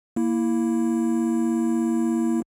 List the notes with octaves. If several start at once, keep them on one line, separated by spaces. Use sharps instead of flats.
A#3 E4